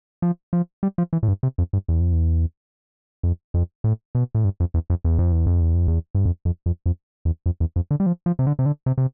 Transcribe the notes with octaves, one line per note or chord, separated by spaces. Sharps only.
F3
F3
G3
F3
E3
A2
G2
C3
F2
G2
E2
F2
E2
F2
F2
A2
B2
A2
G2
F2
E2
F2
E2
F2
E2
F2
E2
F2
E2
G2
F2
F2
F2
F2
E2
F2
E2
F2
D3
G3
F3
F3
C3
D3
C3
D3
C3
C3